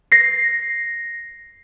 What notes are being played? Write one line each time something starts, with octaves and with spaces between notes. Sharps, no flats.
A#6 C7